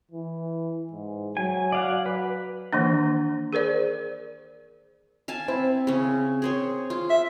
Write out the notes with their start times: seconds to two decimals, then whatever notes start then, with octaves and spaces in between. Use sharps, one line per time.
0.11 E3
0.92 G#2
1.37 F#3 G#5
1.72 D5 F5 F#5
2.06 B4
2.73 D#3 E3 A#3 D4
3.53 G#4 A#4 C5 D5
5.28 F5 G#5 A5
5.48 C4 E4
5.87 C#3 C#4
6.42 G#4 C5 C#5
6.90 F4
7.10 E5